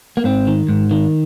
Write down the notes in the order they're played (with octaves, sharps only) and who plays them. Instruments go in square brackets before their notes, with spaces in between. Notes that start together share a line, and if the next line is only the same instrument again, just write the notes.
[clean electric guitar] A#3
G#2 C4
D#3
G#2
D#3